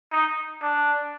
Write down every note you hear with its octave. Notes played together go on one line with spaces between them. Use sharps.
D#4
D4